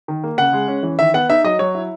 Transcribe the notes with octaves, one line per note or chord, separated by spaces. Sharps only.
D#3
A#3
C#3 F#5
G#3
C#4
E3
D#3 E5
B3 F#5
D#4 E5
F#3 D#5
F#3 C#5
E4